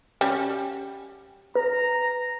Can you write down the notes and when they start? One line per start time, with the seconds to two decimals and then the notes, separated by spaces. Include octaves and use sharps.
0.21 G3 C#4 F#4 G5
1.55 B4 A#5